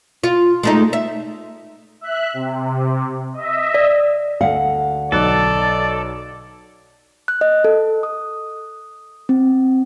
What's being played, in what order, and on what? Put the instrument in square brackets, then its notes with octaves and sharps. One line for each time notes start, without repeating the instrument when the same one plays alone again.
[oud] F4
G#3 A3 D#4
E5
[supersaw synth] E5 F#6
C3
D#5 E5
[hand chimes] D5
[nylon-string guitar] D2 F#5 [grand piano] F5
[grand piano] B1 F#6 [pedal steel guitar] A4 [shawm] D5
[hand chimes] F#6
D#5
A4
D#6
C4